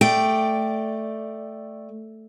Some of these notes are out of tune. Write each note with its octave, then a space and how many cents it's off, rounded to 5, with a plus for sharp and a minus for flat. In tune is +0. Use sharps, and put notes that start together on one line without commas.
A3 +0 D5 +5 G5 -10